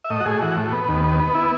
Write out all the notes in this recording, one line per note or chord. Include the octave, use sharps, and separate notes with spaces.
E5
A2 D#5
F#4
A2 G#4
E3 F#4
A2
B3
D#2
B3
B3
E4